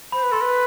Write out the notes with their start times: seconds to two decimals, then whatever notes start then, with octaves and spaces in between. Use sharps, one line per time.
0.12 C5 B5
0.23 B4
0.32 A4 C6
0.41 B4